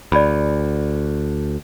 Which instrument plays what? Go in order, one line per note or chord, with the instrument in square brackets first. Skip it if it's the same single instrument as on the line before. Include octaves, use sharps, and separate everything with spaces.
[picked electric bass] D2 [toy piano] D5 B5